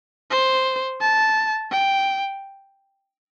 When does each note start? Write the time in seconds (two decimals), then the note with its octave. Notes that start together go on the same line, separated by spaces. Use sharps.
0.31 C5
1.00 A5
1.71 G5